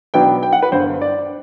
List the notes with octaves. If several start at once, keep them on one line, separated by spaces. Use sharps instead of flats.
B1 B2 F#3 B3 D4 G5
G5
F#5
B4
G1 G2 D3 C5
D5